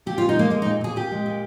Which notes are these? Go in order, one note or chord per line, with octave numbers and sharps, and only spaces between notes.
A#2 G4
F4
A#2
D#4
G#3 A#3
G#3 A#3
D#4
A#2
A#2 G#4
A#2 G4
G#3
A#2